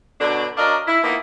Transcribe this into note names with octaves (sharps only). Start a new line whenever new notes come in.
B2 D3 F#3 D4
F#3 D4 A#4 D5 D#5 F5
E4
F3 A#3 B3 D#4 E4